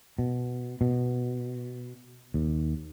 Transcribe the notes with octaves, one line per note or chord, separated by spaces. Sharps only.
B2
B2
D#2